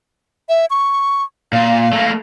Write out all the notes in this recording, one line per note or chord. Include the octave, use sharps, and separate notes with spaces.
E5
C#6
A#2 F5
A3 A#3